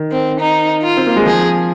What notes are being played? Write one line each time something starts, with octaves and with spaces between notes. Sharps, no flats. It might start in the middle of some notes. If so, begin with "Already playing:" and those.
Already playing: D#3
C4
D#4
F4
C4
A#3
G#3
F3 G#4